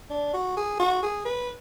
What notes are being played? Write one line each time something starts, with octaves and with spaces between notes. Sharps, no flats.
D4
F#4
G#4
F#4
G#4
B4